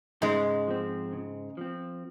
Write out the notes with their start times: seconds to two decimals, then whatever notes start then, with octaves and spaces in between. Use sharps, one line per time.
0.22 G#2 C#3 G#3
0.68 F3 C4
1.13 C#3
1.57 F3 C4